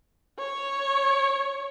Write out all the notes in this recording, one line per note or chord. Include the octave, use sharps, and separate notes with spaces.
C#5